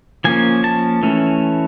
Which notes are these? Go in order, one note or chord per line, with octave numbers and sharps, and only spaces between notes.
F3 A#3 C#4 G#5
A5
E3 A3 C#4